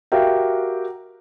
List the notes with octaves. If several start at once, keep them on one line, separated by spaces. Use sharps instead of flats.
F#4 G4 A#4 E5 F5 G5